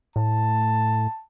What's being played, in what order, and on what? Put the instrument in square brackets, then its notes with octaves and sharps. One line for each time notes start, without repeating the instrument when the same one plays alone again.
[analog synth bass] A2 [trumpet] A5